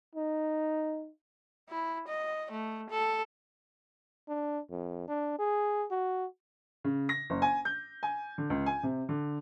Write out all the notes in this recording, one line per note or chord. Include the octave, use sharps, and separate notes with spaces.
D#4
E4
D#5
A3
A4
D4
F2
D4
G#4
F#4
C#3
A#6
F#1
G#5
G6
G#5
D3
C#2
G#5
C3
D3